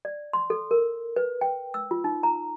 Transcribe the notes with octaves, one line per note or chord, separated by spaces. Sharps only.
D5
C6
A4
A#4
B4
G5
E6
F4
D#4
A#5